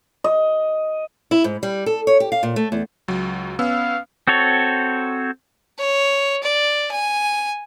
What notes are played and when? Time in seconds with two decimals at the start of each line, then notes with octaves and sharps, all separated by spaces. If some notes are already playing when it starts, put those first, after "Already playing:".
0.24 D#5
1.31 E4
1.44 G#2
1.63 G3
1.86 A4
2.07 C#5
2.20 G4
2.32 F5
2.43 A#2
2.56 A3
2.72 E2
3.08 C#2 F#3
3.59 B3 C#4 F5 E6
4.28 C4 F#4 A4 C#5
5.78 C#5
6.43 D5
6.91 G#5